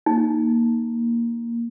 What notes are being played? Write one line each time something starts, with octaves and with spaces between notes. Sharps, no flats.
A#3 D#4